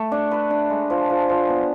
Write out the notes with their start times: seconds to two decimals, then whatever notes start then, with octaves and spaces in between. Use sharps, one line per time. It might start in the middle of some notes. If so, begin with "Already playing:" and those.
Already playing: A3
0.12 D4
0.31 B4
0.50 D4
0.70 G#3
0.90 F3
1.09 F3
1.29 F3
1.49 B3